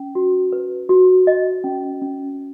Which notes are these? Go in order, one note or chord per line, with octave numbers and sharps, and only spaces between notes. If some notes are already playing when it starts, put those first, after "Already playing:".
Already playing: C#4
F#4
B4
F#4
D#5
C#4
C#4